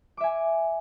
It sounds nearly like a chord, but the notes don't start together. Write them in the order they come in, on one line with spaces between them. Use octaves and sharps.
D6 E5 G#5